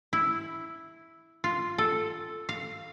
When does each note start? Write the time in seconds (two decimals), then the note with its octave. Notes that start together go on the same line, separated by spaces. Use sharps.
0.13 E4
1.44 F4
1.78 A4
2.49 F5